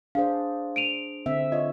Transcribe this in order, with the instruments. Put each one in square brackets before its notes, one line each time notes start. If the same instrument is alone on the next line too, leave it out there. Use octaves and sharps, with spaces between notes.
[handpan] D4 G#4 C5 [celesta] F5
[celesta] D7 D#7 F7
[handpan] D3 C4 E5
[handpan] F4 C#5 [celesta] D#5